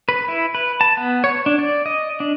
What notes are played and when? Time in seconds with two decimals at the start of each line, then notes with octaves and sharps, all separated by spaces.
0.09 B4
0.28 E4
0.55 B4
0.81 A5
0.97 B3
1.24 C#5
1.46 D4
1.59 D5
1.86 D#5
2.20 D4